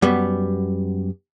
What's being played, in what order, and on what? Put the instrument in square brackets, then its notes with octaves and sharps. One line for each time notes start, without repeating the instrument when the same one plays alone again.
[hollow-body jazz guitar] F#2 G3 B3